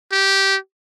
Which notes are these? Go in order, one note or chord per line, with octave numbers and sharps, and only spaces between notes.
G4